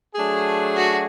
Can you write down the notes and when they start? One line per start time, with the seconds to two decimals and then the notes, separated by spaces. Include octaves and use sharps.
0.15 F#3 A3 D4 G#4
0.76 F#4